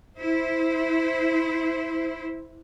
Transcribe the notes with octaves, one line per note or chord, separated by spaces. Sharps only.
E4 C5